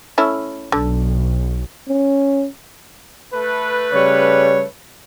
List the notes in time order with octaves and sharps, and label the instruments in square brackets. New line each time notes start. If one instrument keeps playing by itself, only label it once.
[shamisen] A3 C#4 E4
[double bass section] B1 [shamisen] D3
[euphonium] C#4
[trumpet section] A3 B4
[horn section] C#3 G3 C#5